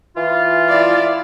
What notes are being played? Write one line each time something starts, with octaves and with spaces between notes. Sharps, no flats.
E3 F4
E4 D5